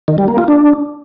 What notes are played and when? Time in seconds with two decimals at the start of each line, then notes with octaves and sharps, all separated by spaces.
0.08 D#3
0.18 G3
0.28 A#3
0.38 F4
0.48 D4